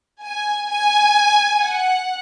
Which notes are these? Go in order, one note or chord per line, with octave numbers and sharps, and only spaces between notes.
G#5
G#5
F#5